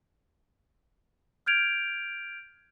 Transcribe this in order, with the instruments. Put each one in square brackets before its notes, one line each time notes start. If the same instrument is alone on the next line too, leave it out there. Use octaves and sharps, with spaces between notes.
[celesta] F6 G6 G#6 D7 F7